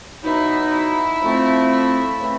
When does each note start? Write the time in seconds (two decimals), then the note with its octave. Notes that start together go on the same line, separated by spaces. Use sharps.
0.24 B2 F#3 B3 D#4 E4
0.73 E4
1.21 F3 A3 C4
1.70 E4
2.20 C#3 E3 A3 C4